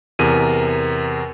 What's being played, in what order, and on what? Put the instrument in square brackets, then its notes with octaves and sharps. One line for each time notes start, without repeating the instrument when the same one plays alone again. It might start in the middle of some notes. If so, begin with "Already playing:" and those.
[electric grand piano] E2 C3 A#4 D#7